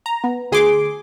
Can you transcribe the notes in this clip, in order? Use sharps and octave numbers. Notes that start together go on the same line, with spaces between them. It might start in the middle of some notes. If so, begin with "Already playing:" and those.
A#5
B3
D2 G#4 C6 D6